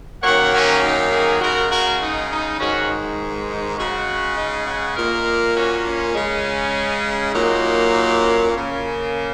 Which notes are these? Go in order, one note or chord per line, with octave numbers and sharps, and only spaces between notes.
F#2 D#3 F#3 A#3 C#5 F#5
C#4 F#4
D#4
D#4 G#4
C#3 G#3 F#4 A#4
F#4 A#4
D#4
D#4
G#2 D#3 G#3 C#4 F#4
D#4
D#4
C#3 G#3 C#4 F#4
D#4 G#4
C#5 F#5
A#2 A#3 A#4 D#5
C#4 F#4
C#4
C#3 G#3
A#2 F#3 A#3 D#4
D#4
C#4
A#3
C#3